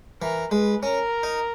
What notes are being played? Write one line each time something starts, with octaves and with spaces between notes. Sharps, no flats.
E3 A#4
G#3 B4
C#4 A#4
D#4